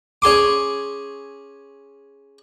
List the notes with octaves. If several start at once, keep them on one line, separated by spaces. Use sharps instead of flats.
C#4 G#4 C6 D6